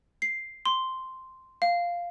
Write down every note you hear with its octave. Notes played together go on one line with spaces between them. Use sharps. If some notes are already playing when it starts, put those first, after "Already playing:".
C7
C6
F5